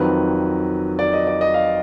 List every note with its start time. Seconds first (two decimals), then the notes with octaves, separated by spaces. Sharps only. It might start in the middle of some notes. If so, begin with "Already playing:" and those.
Already playing: F2 D#3 F#3 B4
0.99 D5
1.13 D#5
1.27 D5
1.41 D#5
1.54 F5